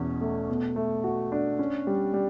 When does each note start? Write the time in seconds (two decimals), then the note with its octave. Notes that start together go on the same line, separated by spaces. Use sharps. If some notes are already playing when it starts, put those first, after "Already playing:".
Already playing: E2 B2 C#4
0.21 A3
0.49 B2
0.76 A3
1.04 F#4
1.32 D4
1.59 C#4
1.87 G3
2.14 G3